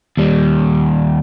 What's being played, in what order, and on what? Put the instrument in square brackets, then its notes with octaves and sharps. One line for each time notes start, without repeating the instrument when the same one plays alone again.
[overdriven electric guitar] D#2 G3